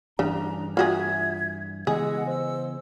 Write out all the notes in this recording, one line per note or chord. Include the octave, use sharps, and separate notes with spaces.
G2 C#3 E3 D4 A#5
F4 F#4 G#4 E5 G#6
C#3 E3 G#3 B3 G#4 D#5 F#5 E6
C5 E6